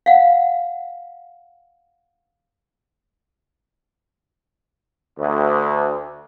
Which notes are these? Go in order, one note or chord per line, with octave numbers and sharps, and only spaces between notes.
F5 F#5
D2